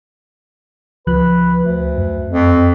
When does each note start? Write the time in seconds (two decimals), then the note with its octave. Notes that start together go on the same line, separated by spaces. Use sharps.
1.07 C#2 F3 B4 F#6
1.62 D2
1.97 F#2
2.30 F2